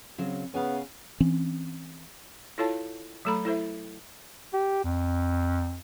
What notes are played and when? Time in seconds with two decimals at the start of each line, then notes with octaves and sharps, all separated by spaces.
0.18 C#3 F#3 C4
0.54 C#3 B3 F5 G#5
1.20 E3 C4 C#4
2.58 E4 F4 A4 C#5 F5 A5
3.25 F#3 A3 A4 A#5 B5
3.45 E4 A4 C5 E5
4.53 G4
4.84 F2